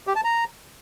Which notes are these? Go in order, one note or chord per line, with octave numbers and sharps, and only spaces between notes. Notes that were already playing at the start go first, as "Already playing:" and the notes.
G4
A5
A#5